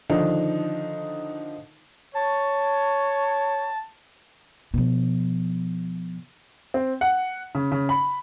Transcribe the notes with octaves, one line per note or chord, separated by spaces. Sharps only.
D3 D#3 F3 D4 D#4
C#5 A5
B2 F3
C4
F#5
C#3
C#3
B5